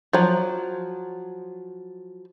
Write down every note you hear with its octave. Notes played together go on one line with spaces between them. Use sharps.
F3 F#3